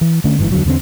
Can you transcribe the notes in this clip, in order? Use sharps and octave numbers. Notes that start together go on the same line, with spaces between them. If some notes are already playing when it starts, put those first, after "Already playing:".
E3
D3 A3 C#4
G1 G#2 C#3 E3
E2 D3 F#3
E2 D3 B3 C4